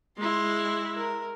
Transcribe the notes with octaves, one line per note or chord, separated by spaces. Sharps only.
G#3 E4 C6
A#4